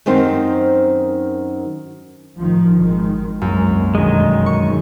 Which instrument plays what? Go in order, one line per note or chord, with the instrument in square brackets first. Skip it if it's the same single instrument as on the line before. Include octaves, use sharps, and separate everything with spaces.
[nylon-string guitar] F#2 D#3 C4 D#4 C5
[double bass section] A1 D#3 F3
G#1 D#3 G#3
[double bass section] C2 G#3 A#3 [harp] F#2
[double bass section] F1 B2 D3 [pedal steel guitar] D#3 G#3
[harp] C#6